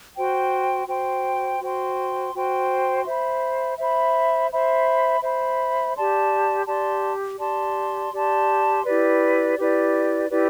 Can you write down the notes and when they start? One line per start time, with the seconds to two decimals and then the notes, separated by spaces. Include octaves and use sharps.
0.16 F#4 C5 G5 C6
0.88 F#4 C5 G5 C6
1.61 F#4 C5 G5 C6
2.34 F#4 C5 G5 C6
3.06 C5 E5 B5
3.78 C5 E5 B5
4.49 C5 E5 B5
5.22 C5 E5 B5
5.94 G4 D5 A5 C6
6.66 G4 D5 A5 C6
7.39 G4 D5 A5 C6
8.12 G4 D5 A5 C6
8.84 E4 G4 B4 D5
9.56 E4 G4 B4 D5
10.29 E4 G4 B4 D5